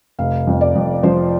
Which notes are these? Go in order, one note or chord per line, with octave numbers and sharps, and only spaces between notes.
F1 F5
F2
D5
F2
F3 C5